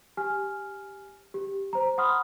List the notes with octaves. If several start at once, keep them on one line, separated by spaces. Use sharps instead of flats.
G4 G#5 F6
G4
C5 A#5
F#5 B5 C6 D#6 F6